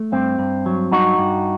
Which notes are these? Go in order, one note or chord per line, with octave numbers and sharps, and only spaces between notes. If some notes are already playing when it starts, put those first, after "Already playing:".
Already playing: A3
G2 C4
G2
F#3
G2 D#4 F#4
G2